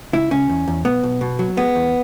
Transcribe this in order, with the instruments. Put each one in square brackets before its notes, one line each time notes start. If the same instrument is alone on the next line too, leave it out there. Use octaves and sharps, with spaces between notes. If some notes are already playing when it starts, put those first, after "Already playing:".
[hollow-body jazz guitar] C#2 E4
C#2 C#4
E2
E2
B1 B3
B1
B2
F#3
G#3 B3
E2